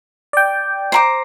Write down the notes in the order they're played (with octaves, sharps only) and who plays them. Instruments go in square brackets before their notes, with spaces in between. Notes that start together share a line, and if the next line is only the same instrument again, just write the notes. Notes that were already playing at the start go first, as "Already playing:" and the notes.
[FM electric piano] D5 G5
[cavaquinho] C5 A#5 D6